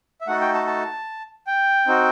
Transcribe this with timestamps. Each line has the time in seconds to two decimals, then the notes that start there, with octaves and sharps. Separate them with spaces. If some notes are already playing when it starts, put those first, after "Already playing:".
0.21 E5
0.27 A3 D#4 F#4 A4 F#5
0.41 G5
0.54 A5
0.67 A5
1.47 G5
1.87 C4 D#4 F#4